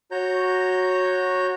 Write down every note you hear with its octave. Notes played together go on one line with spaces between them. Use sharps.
F#4 C#5 A#5 G6